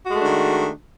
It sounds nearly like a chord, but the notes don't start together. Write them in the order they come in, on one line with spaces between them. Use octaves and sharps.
F#4 G#3 A3 D4 D#3